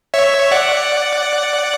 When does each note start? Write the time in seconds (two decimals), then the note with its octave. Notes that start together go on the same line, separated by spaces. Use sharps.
0.14 C#5 E5
0.51 D5 F#5